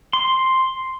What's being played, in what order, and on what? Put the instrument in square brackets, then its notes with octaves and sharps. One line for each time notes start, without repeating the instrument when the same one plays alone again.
[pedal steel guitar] C6